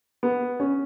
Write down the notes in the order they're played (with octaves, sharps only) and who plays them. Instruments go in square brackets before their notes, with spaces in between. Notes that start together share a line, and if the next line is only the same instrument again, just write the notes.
[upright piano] B3
C#4